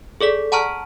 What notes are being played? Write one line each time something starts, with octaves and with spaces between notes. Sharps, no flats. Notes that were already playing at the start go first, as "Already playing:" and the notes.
G#4 A4 D5 B6
F#5 A5 A#5 C#6 F6